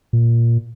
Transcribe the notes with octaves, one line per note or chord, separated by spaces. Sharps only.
A#2